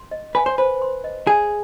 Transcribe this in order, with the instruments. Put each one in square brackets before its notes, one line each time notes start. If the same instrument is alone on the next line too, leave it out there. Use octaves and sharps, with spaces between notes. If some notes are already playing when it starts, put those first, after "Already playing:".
Already playing: [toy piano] C6
D#5
[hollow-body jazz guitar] B4 [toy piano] G#5
[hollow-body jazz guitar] C5
[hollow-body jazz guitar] B4 [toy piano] C5
[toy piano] C6
D#5
[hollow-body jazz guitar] G#4 [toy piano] G#5